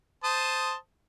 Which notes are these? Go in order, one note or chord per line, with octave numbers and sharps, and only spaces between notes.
C5 A5 D#6